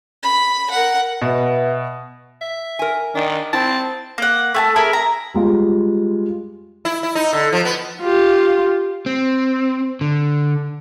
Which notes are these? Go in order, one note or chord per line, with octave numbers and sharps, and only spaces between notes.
B5
A#4 F#5
B2 B4 E5 F#5
E5
A#4 G#5
D#3 D4
C4 E4 A5
A#3 F#5
A3 G#5 A5
E4 G#4 A#4
A#5
G3 G#3 F4
E4
E4
D#4
D3
F3
B3
F4 G4
C4
D3